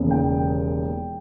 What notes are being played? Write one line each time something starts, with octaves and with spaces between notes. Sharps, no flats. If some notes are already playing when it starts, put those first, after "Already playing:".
Already playing: E1 D#2 C#3
G5